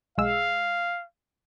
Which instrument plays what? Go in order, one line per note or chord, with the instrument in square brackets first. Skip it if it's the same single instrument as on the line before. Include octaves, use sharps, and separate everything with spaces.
[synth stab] B1 G#3 E6 [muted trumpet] F5